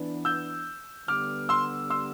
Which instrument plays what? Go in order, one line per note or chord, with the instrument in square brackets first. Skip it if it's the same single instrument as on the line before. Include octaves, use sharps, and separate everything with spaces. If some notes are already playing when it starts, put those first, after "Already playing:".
Already playing: [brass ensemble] E3 B3 D4
[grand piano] E6 G6
[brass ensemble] D3 G3 B3 [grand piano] D6 F6
[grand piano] C6 E6
C6 E6